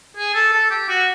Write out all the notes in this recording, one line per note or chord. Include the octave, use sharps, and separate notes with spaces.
G#4
A4
A4
G4
F#4